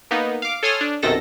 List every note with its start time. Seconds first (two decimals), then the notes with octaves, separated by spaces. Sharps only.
0.11 A#3 B3 D#4
0.42 F5 D6
0.63 A4 C#5 G#5 C6 D#6 F6
0.81 D4
1.02 B1 F#2 C3 D#3 A4 A#6